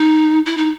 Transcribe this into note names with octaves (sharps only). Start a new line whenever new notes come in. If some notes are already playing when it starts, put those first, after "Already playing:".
Already playing: D#4
E4
D#4